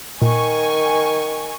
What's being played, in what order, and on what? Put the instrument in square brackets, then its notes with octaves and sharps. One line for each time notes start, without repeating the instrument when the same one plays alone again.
[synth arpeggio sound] A#2 [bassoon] D#3 [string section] G#5 C#6